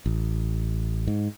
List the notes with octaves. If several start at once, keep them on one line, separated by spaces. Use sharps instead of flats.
A1
G#2